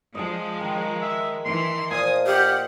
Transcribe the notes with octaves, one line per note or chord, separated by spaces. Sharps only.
F3 G#3 D#5 A5
D#3
E5
E3 C6
A#2 F3 D#5 G#5 D#6
G4 F5 F#5